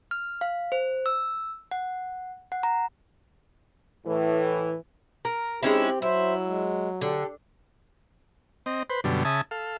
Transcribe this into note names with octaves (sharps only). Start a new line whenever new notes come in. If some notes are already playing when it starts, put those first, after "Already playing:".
F6
F5
C5
E6
F#5
F#5
A#5
A2 E3
A#4
G#3 C4 C#4 D#4 E4 G4
F#3 E4 C5 E5
G#3
D3 G4 A4
C4 D#5
B4 C5
F#2 B2 D3 G3
C#3 E5 G#5 A5 D#6
A4 F5